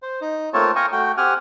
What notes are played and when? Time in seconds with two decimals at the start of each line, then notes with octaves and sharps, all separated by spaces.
0.02 C5
0.21 D#4
0.53 A3 A#3 C4 F4 C#5 A5
0.76 F5 G5 G#5 A#5 C#6 D#6
0.92 A3 F#4 G5
1.17 C4 G4 F#5 G#5 F6